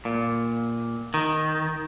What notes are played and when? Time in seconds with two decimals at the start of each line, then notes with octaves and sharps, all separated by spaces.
0.05 A#2
1.14 D#3